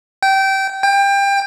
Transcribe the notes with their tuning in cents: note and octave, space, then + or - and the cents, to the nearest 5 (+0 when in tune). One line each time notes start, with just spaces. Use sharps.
G5 -20
G5 +25